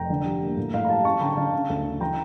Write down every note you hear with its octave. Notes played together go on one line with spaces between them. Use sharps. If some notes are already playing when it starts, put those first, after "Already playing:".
Already playing: F1 G5 A#5
D3
G3
A#3
A2
A2 F5
A#5
G3 F5 A5
C#4 A5 C#6
D3 G5 A#5
G5
D3 F5 A5
C#3
D2
C#3
E3 G5 A#5